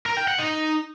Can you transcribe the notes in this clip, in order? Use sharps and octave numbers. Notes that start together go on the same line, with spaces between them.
A#4
G5
F#5
D#4